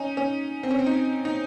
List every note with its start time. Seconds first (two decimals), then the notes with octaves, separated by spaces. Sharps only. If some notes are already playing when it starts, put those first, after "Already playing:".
Already playing: C#4 D#4
0.17 C#4
0.63 C4
0.71 C#4
0.79 C4
0.86 D#4
1.25 D#4